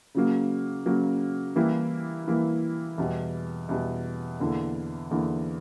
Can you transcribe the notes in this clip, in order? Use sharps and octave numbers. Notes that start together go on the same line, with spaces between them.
C#3 F#3 A#3
C#3 F#3 A#3
E3 G3 A#3 E4
E3 G3 A#3 E4
E2 B2 G3
E2 B2 G3
E2 D3 A#3 E4
E2 D3 A#3 E4